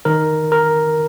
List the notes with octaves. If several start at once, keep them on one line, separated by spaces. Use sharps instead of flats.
D#3 A#4
A#4